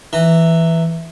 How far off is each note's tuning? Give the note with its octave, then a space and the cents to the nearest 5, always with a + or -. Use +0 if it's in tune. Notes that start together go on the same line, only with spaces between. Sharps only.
E3 +0 A#5 -25